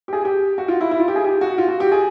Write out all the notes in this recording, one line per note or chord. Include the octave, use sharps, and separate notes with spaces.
G4
G#4
G4
F#4
F4
E4
E4
F4
G4
G#4
G4
F#4
F4
F#4
G4
G#4